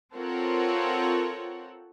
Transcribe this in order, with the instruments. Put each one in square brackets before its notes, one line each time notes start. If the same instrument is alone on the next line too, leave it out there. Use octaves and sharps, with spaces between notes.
[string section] C4 F4 A4 A#4 C#5 F#5